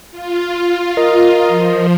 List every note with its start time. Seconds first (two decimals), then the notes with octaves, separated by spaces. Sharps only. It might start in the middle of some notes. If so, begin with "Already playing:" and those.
0.11 F4
0.97 A#4 D#5
1.48 F3